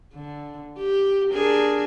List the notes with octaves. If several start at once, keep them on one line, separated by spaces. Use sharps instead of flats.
D3
G4
D4 G#4 A#4